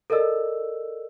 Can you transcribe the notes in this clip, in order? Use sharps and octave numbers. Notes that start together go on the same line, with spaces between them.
A4 A#4 D5 D#5 E6